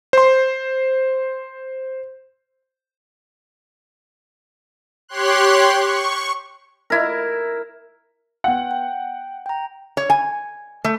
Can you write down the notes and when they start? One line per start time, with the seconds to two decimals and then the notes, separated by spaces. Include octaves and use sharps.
0.13 C5 C6
5.09 G4 C#5 C6 F#6
5.81 C#6
6.90 E4 A#4
8.44 B3 F#5 G5
8.71 G5
9.46 G5 A#5
9.97 C#5
10.10 G#5
10.84 A3